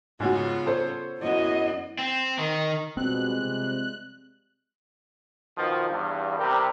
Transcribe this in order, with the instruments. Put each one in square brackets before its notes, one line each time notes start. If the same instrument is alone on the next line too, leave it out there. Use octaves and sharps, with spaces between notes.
[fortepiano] G#2 F#3 F#4 [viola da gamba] C#3 B3 F4
[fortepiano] A4 C5 C#5
[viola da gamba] F#2 B3 [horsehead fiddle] E4 D#5
[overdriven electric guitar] C4
D#3
[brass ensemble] B2 [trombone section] F3 G3 G#3 [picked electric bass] C4 [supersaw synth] F#6
[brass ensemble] C3
[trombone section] B2 D#3 F3
E2 G2
C3 G3 G4 A#4